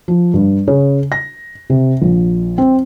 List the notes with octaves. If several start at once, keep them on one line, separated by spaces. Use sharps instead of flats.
F3
G2
C#3
A#6
C3
A#1
C4